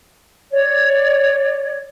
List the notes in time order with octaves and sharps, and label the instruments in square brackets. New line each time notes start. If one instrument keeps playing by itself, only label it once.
[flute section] C#5 D5